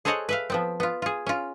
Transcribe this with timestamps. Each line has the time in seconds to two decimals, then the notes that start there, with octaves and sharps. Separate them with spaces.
0.05 G#4 A4 C5 C#5 D#5 F#5
0.29 B4 E5 F5
0.50 F3 B3 C4
0.80 B3 F4
1.02 F4 G#4
1.26 C#4 F4